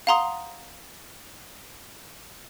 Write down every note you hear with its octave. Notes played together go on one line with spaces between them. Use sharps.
F5 F#5 A#5 C6 D#6